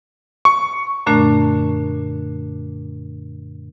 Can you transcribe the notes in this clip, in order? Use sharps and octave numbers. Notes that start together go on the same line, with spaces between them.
C#6
F#2 A#2 D3 A3 D4